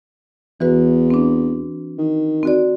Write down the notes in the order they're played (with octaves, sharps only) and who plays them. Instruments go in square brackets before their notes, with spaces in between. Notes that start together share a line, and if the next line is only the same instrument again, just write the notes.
[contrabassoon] E2 [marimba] E3 F#4 B4
[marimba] C4 D4
[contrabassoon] D#3
[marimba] C4 F#4 D5